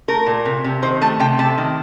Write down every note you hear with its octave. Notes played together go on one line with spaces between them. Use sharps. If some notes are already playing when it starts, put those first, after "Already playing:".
A3 A#4
A#2
C3
C3
D#3 C5
A3 A5
C3 G5
C3 A5
D#3